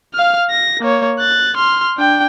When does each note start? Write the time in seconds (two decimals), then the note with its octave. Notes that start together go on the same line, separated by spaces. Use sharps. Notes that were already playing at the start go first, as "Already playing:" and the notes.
0.14 F5 F6
0.50 A#6
0.80 A#3 C#5
1.19 F#6 A6
1.57 C6 F6
1.97 D4 G5